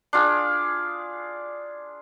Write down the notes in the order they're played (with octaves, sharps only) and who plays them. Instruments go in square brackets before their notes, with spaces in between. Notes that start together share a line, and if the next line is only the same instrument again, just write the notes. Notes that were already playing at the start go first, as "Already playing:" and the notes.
[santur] D4 F4 G#4